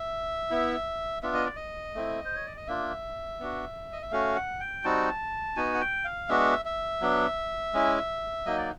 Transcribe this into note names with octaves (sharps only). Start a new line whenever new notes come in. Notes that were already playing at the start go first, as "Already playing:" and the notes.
Already playing: E5
B3 E4
B3 D4 F4 E5
D#5
D5
D#5
A3 C4 E4
C5
C#5
D5
D#5
A#3 D4 F4 E5
B3 D4 F#4
D#5
E5
A3 C#4 F#4 F5
F#5
G5
G3 C4 D#4 F#4 A5
B3 D#4 F#4 G#5
F#5
G5
F5
G#3 B3 D4 F#4 E5
E5
F#3 B3 D4
G#3 C#4 E4
F#3 A#3 D#4 D#5
D5